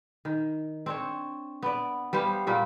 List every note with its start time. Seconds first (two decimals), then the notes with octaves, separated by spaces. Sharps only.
0.25 D#3
0.86 C4 D4 C#5
1.62 B3 D5
2.13 G3 B3 C5 F5
2.47 A#2 G3 A#3